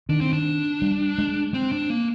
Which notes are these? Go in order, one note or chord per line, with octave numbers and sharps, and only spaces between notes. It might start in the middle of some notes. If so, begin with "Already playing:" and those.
D#3 D4
C4
D4
G3
G#3
C4
D4
A#3